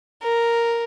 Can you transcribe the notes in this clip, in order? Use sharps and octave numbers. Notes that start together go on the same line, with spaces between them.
A#4